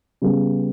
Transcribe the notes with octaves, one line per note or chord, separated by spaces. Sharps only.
C#3 G3 B3